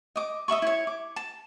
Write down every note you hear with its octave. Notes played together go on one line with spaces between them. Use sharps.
D#5 D6
D#5 E5 B5 C#6
E4 C#5
D6
A5